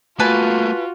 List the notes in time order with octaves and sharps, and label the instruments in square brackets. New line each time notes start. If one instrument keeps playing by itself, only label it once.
[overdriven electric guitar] A3 A#3 [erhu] F4 [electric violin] F#4 [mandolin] B4 G#5 A5